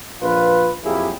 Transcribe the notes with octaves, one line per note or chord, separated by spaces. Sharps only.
A#1 F4 B4
F2 F#3 A#3 E4 G4 G#4